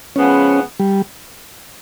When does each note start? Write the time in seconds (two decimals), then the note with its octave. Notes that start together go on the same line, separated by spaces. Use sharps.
0.16 C#3 F3 G#3 B3 C#4
0.80 G3